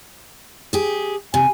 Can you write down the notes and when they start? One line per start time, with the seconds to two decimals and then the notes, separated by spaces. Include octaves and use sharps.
0.73 G4 G#4
1.34 C3 G#5